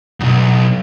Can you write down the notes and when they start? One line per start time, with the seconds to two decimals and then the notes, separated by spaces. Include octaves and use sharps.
0.20 B1 F#2